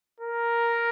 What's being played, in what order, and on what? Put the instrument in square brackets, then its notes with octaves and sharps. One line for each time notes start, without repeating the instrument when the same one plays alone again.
[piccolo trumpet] A#4